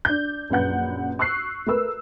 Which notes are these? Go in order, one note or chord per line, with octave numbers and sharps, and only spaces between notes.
D4 G6
A#1 F#2 B4 F#5 G6
C#6 E6 F#6 C7
A3 A#4 B4 E6